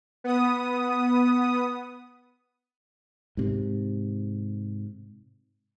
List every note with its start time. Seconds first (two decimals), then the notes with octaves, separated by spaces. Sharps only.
0.24 B3 D#6
3.37 G#2 C3